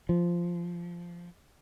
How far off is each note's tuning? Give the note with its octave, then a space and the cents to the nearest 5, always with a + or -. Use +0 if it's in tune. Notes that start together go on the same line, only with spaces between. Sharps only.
F3 -10